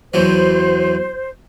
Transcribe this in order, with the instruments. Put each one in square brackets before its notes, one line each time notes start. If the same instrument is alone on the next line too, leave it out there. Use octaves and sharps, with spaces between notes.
[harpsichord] E2 E3 F#3 [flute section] C5